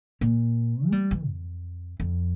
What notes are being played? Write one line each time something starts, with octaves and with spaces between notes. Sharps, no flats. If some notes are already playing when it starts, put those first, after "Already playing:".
A#2
A3
G3
E3
F2
F2